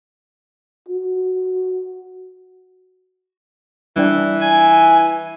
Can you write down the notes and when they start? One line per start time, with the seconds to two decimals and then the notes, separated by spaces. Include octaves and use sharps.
0.89 F#4
3.96 E3 G3 D4 G5
4.41 G#5